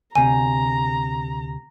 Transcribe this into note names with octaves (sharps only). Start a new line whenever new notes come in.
D2 C3 G#5 A#5